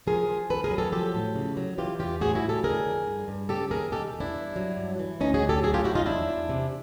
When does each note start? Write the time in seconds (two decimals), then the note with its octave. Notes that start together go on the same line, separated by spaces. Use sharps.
0.07 F3 G#4 A#4
0.28 F3
0.50 D#3 A4 B4
0.64 G#4 A#4
0.71 F#3
0.78 G4 A4
0.92 F3 G4 A4
1.14 A2
1.35 C#3
1.57 F#3
1.78 E3 F4 G4
1.99 E2 F4 G4
2.20 A2 F#4 G#4
2.35 E4 F#4
2.42 A2
2.49 G4 A4
2.63 D3 G#4 A#4
2.85 F2
3.07 G2
3.28 G2
3.49 C#3 G4 A4
3.70 D#2 G#4 A#4
3.92 B2 G4 A4
4.13 E2
4.20 D4 E4
4.35 G2
4.56 F#3
4.77 G2
4.99 E3
5.20 D2 C#4 D#4
5.34 F#4 G#4
5.42 D2
5.49 G4 A4
5.63 F#3 F#4 G#4
5.74 F4 G4
5.84 F#3 E4 F#4
5.95 D#4 F4
6.06 E2 D4 E4
6.27 E2
6.49 C3